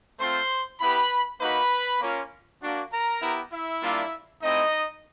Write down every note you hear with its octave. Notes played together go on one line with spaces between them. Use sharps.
A3 C4 F4 C5 C6
B3 E4 G4 B4 B5
A#3 D#4 F#4 B4 B5
A#3 C#4 F4
A#3 D4 F#4
A#4 A#5
B3 E4 G4
E4 E5
G3 A#3 D4 F4
A3 C4 D#4 E4 D#5